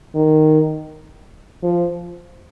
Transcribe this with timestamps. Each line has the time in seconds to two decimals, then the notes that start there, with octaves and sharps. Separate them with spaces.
0.15 D#3
1.63 F3